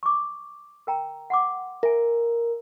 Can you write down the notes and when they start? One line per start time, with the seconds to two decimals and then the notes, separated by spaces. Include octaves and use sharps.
0.03 C#6 D6
0.87 A#4 G5 A#5
1.30 F#5 C6 D6
1.83 A#4 E5 G#5